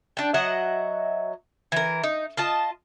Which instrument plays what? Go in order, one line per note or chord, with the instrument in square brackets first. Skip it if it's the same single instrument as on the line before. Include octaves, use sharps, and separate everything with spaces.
[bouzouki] D4 G5
F#3 D#5 E5 F#5
E3 A#4
D#4
F4 D#5 A5